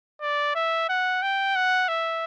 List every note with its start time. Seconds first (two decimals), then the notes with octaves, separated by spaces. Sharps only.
0.22 D5
0.55 E5
0.89 F#5
1.22 G5
1.56 F#5
1.88 E5